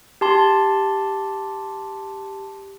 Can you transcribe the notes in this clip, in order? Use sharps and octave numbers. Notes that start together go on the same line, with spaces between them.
G4 A5 C6